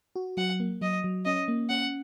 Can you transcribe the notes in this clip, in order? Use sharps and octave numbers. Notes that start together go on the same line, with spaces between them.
F#4
F#3 F#5
A#3
F#3 D#5
F#3
C#4 D#5
A#3
C#4 F#5